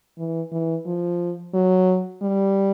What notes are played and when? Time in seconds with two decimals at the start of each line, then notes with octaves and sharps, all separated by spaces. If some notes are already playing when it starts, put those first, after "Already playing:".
0.18 E3
0.52 E3
0.86 F3
1.54 F#3
2.22 G3